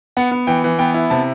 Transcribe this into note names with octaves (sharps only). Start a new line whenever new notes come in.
B3 F#5
B3
E3 G5
E3
B3 G5
E4
C3 A5